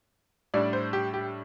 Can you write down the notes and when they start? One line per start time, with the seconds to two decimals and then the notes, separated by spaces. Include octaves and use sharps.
0.54 A2 G3 D4 D5
0.73 C5
0.93 G4
1.14 G4